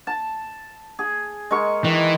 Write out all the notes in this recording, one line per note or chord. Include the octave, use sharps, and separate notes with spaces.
A5
G#4
G#3 A#4 C#6
D#3 E3